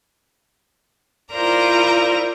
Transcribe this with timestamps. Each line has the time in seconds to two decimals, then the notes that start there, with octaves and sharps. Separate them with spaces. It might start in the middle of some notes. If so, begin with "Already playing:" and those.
1.33 E4 F4 A#4 C5 D5 A#5